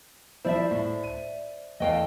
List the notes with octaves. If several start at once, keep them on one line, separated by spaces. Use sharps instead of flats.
F3 G3 E4 C5 D5 E5
A2
D#7
E2 A3 D#5 F5 G5